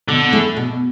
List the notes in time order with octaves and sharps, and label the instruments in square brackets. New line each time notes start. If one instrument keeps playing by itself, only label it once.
[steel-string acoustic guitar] B2 [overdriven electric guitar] D3
[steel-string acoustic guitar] A3 E4 G#4
B2